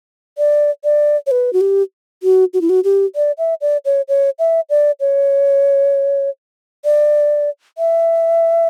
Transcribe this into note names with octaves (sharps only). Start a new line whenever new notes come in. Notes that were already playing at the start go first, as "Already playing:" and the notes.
D5
D5
C#5
B4
F#4
G4
F#4
F#4
E4
F#4
G4
D5
E5
D5
C#5
C#5
E5
D5
C#5
D5
E5